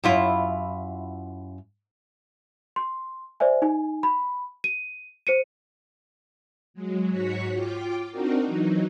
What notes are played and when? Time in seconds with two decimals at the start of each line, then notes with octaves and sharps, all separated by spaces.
0.04 F#2 E4 F4
2.76 C6
3.40 C5 D5 E5 G#5
3.62 D#4 G#5
4.03 B5
4.64 D#7
5.27 C5 C#7 D#7
6.74 F#3 G#3
7.10 G#2 F#4 C#5 B6 C#7
7.52 F4 G5 D6
8.11 C4 D4 D#4 F#4 A#4
8.46 E3 F#3 D#4